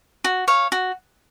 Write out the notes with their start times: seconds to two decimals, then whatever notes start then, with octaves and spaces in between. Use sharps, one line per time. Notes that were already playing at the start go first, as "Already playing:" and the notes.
0.24 F#4
0.48 C#5 F5
0.72 F#4